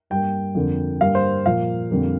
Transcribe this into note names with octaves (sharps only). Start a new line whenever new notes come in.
G2 G3 A#3 G5
F2 D3 A#3
G2 G3 A#3 F5
C5
A#2 F3 A#3 F5
F2 D3 G3 A#3